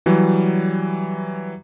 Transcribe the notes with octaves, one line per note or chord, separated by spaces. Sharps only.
E3 F#3 G3